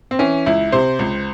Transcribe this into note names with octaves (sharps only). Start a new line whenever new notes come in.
C4
E3 C#4
C#2 E4
C3 C5
C#2